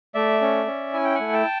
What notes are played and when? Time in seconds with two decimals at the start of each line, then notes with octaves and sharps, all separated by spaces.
0.15 A3 D5 E5
0.41 C#4
0.67 C#4
0.94 E4 G#5
1.04 G5
1.15 F#5 G#5
1.20 A3
1.33 G5 A5